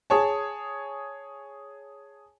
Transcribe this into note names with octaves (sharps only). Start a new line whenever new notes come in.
G#4 C#5 A5